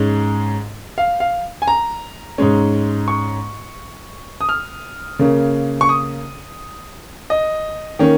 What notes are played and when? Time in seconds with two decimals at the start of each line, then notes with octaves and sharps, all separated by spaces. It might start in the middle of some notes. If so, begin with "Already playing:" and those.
Already playing: G#2 G#3 C#4
0.98 F5
1.20 F5
1.62 G#5
1.68 A#5
2.38 G#2 G#3 C#4
3.08 C#6
4.41 D#6
4.49 F6
5.19 C#3 A#3 C#4
5.81 C#6
5.89 D#6
7.30 D#5
7.99 D#3 A#3 C#4